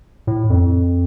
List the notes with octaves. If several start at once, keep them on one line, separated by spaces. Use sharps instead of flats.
A2
F2